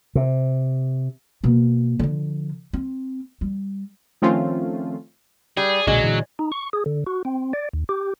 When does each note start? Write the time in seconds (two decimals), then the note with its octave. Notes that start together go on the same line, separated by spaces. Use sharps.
0.15 C3
1.44 B2 A#3
1.99 D3 F3
2.73 C4
3.41 G3
4.22 D#3 F3 A3 C4 C#4 F4
5.57 G3 G#4
5.87 B1 A#2 D3 F#3 G#3
6.04 A#2 D3 E3
6.39 D#4
6.52 C#6
6.73 G#4
6.86 D3
7.07 F#4
7.25 C4
7.53 D5
7.73 D#2
7.89 G4